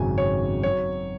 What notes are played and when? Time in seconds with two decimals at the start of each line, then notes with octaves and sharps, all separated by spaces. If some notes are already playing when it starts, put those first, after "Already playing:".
Already playing: G#1 F#2 C#3 F#3 C#4 G#5
0.18 C#5
0.63 F#3 C#5